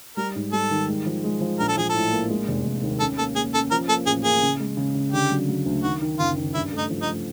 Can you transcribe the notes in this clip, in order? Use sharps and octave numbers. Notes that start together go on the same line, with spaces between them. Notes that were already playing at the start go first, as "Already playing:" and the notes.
G3 A#4
G#2
G3 A4
D#3
G#3
F3
G#3
F3
A#1 A#4
A4
F3 G#4
A2 A4
A#3
G#3
F1
F1
D#2
C#4 A4
A#3 A4
A#3 G#4
C#4 A4
F3 A#4
A#3 A4
A1 G#4
A#3 G#4
C#3
G#3
C#3
C#3
D3 G4
F#3
F#3
D2
D#3 F#4
D#3
F#1 F4
D#3
G2 E4
A3
D#4
F3
D#4
A3